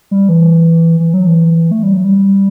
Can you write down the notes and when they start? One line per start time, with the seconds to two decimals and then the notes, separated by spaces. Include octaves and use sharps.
0.11 G3
0.29 E3
1.00 E3
1.14 F#3
1.27 E3
1.71 A3
1.83 G3
1.93 F#3
2.04 G3